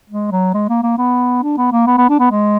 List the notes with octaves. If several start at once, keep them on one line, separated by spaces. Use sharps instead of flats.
G#3
F#3
G#3
A#3
A#3
B3
D4
B3
A#3
B3
B3
D4
B3
G#3